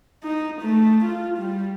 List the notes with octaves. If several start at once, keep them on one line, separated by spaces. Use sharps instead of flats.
D#4
A3
F4
G3